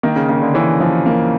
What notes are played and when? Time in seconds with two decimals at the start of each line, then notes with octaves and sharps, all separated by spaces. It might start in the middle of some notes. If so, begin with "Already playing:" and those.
0.03 D#3 A#3
0.16 C#3
0.29 C#3 A#3
0.42 D3
0.54 E3 C#4
0.80 F3
1.06 A#3